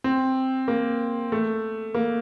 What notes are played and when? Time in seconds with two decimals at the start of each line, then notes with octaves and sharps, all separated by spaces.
0.04 C4
0.68 A#3
1.32 A3
1.94 A#3